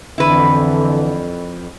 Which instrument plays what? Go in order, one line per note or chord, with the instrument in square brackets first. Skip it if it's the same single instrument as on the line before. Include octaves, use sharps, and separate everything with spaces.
[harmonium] F2 [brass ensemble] D3 [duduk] E3 [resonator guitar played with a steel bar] E4 B4